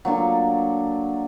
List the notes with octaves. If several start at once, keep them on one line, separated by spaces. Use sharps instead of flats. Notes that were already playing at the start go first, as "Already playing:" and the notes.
F#3 A#3 D4 A4